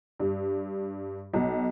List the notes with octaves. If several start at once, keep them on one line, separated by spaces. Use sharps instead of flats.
G2
B1